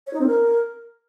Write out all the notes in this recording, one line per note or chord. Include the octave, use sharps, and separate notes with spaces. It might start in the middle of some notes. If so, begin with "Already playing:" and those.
C#5
D#4
C4
A#4